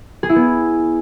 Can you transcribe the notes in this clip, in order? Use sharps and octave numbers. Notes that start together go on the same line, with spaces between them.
G#4
E4
B3